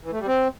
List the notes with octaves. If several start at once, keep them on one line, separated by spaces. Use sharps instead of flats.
E3
A3
G3
C4